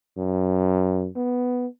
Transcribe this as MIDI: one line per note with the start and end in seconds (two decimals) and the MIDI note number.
0.17 1.07 42
1.16 1.67 59